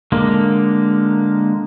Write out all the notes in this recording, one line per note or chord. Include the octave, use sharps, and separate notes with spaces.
D3 G#3 A#3